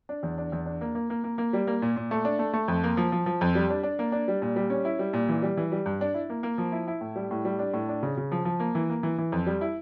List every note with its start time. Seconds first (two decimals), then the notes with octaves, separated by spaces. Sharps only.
0.09 D4
0.23 E2
0.38 D4
0.52 E2
0.66 D4
0.81 A#3
0.95 A#3
1.10 A#3
1.24 A#3
1.38 A#3
1.53 G3
1.67 A#3
1.82 A#2
1.97 A#2
2.11 A3
2.25 D4
2.39 A3
2.53 A3
2.68 F2
2.84 A#3
2.97 F3
3.12 F3
3.26 F3
3.41 F2
3.55 G3
3.70 D4
3.83 D4
3.99 A#3
4.12 D4
4.28 G3
4.42 A#2
4.56 G3
4.70 C#4
4.85 E4
4.99 G3
5.13 A#2
5.29 E3
5.42 G3
5.57 E3
5.72 G3
5.86 G2
6.01 D4
6.14 E4
6.30 A#3
6.43 A#3
6.58 F3
6.72 E4
6.88 E4
7.01 A2
7.16 G3
7.31 A2
7.45 G3
7.59 D4
7.74 A2
7.89 D4
8.03 C#3
8.17 C#3
8.32 F3
8.45 F3
8.60 A#3
8.75 E3
8.90 A#3
9.03 E3
9.18 E3
9.32 F2
9.47 G3
9.61 E4